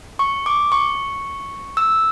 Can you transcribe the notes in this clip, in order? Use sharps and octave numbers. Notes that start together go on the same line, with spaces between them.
C#6
D6
C#6
E6